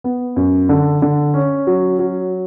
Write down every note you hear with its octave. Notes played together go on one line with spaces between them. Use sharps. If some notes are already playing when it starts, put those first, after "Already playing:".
B3
F#2
D3
D3
C#4
F#3
F#3